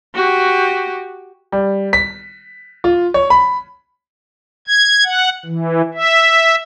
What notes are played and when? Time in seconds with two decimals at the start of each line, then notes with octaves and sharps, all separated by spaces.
0.15 F#4 G4
1.52 G3
1.93 B6
2.84 F4
3.14 C#5
3.30 B5
4.67 G#6
5.05 F#5
5.46 E3
5.94 E5